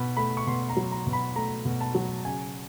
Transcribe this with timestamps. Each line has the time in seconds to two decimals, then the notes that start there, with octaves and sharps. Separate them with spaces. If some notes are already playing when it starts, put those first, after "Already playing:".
Already playing: B2 B5
0.17 A3 B5
0.37 C#6
0.47 B2 C6
0.69 A#5
0.77 F#3
0.92 A#5
1.07 B2
1.13 B5
1.36 A3 A#5
1.65 B2
1.81 A5
1.95 F#3
2.25 C#3 G#5